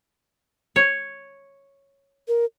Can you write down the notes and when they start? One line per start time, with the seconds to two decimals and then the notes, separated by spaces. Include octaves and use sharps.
0.76 C#5
2.28 A#4